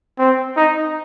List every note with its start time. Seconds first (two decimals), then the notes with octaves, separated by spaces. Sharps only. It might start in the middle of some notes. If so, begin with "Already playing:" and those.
0.19 C4
0.57 D#4